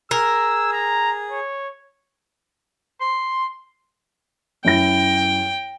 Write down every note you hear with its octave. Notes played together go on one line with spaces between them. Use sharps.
G#4 A#4 E6
A#5
C#5
C6
F#2 E4 G5 A#6